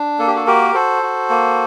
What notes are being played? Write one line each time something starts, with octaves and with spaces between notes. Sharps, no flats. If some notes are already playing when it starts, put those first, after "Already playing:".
Already playing: D4
A#3 A4
G4
F#4 A4
F#4 G4 A#4
F#4 A4 C5
F#4
A#3